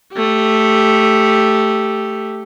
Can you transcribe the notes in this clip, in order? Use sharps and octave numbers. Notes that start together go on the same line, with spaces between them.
A3 G4